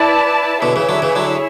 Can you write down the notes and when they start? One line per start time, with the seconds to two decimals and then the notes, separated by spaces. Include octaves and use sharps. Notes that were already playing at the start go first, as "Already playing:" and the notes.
Already playing: E4 B4 D5 A5
0.62 B2 D3 E4 G#4 C#5 E5
0.76 C#3 E3
0.89 D3 F#3
1.02 C#3 E3
1.15 D3 F#3